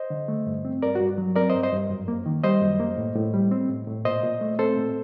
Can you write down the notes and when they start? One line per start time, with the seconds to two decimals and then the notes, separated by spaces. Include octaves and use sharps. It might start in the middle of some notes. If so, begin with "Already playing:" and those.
Already playing: C5 D#5
0.10 D3
0.28 A3
0.46 G2
0.65 C4
0.82 G2 A#4 D5
0.95 G2 F#4
1.18 F#3
1.36 C4 A#4 D5
1.50 G2 C5 D#5
1.63 C5 D#5
1.72 G2
1.90 F#2
2.08 A#3
2.26 D#3
2.44 G3 C5 D#5
2.62 F#2
2.79 A#3
2.97 A2
3.16 A2
3.34 G3
3.51 C4
3.69 A2
3.87 A2
4.05 A#2 C5 D#5
4.23 A#2
4.41 A3
4.59 C4 A4 C5
4.77 A#2